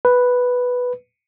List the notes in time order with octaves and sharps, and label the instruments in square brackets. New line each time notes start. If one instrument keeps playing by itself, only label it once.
[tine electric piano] B4